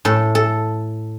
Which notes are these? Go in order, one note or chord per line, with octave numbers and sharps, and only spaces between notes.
A2 A4
A4